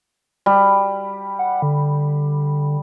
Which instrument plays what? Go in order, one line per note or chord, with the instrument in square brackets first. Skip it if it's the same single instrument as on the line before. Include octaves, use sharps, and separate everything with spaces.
[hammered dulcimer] G3
[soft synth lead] F#5
D3